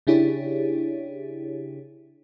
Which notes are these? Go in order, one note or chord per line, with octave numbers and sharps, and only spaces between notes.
C#3 D4 E4 G4 G#4 C#5